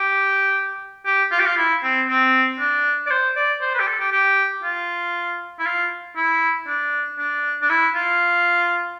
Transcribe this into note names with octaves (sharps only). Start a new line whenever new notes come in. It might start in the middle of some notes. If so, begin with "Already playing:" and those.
Already playing: G4
G4
F4
G4
F4
E4
C4
C4
D4
D5
C5
D5
C5
B4
G4
A4
G4
G4
F4
E4
F4
E4
D4
D4
D4
E4
F4